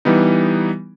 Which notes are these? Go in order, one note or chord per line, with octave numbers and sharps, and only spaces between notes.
E3 G3 B3 D#4